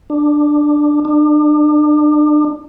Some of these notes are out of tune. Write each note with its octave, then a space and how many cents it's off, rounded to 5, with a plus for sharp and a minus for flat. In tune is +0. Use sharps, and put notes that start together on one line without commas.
D4 +10
D4 +35